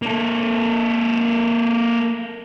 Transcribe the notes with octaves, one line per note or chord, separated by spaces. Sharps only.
A#3 A4